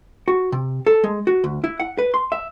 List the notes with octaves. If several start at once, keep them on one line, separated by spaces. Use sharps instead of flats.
F#4
C3
A4
G#3
F#4
D2
E4
F#5
B4
C6
E5